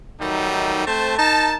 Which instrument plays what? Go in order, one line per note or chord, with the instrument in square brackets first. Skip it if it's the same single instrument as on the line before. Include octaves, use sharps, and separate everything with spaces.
[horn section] D#3 F#3 G3 A3 D#4
A3 C4 C5 A5
D#4 A#4 A5